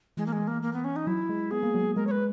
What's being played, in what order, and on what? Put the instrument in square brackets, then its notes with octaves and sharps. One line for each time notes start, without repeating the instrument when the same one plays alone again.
[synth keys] E3 [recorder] G#3
[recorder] A#3
G#3
A#3
A#3
B3
C#4
D#4
[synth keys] F#3 [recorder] E4
[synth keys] G#3
[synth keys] B3 [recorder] G#4
[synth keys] A#3
F#3
F#3
[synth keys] G#3 [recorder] A#4
[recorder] C#5
B4